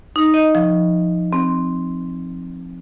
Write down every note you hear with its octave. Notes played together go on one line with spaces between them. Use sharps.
D#4
D#5
F3
C4